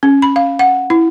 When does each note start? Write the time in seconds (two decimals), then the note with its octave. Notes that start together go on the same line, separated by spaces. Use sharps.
0.03 C#4
0.22 B5
0.36 F5
0.59 F#5
0.90 E4